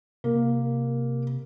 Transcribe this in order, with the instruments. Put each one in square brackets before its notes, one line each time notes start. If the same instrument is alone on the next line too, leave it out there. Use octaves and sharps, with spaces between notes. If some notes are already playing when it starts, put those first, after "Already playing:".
[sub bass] C3 [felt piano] A#3